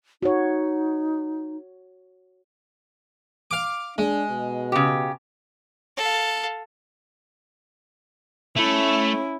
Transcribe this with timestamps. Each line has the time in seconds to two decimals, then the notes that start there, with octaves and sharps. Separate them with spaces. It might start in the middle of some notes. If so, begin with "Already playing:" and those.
0.23 D#4 F#4 C#5
3.51 F5 D6
3.98 G#3 D4
4.30 B2
4.72 C#3 G4
5.97 A4 F5
8.56 A3 C#4 E4